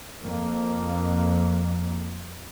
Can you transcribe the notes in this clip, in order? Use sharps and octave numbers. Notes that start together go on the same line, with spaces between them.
F2 A#3